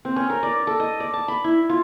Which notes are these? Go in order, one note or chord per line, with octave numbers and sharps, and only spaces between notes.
C4
C#4
A#4
D5
A4
D#5
D5
A5
B5
E4
F4